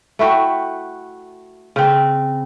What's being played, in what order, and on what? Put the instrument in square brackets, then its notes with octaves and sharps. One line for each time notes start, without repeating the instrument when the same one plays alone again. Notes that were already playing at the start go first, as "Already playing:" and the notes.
[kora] A3 E4 F#4 G5
C#3 C4